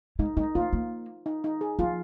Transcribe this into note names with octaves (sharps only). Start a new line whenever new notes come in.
G#3 D#4
G#3 D#4
A#3 F4
A#3
D#4
D#4
G#4
F3 F4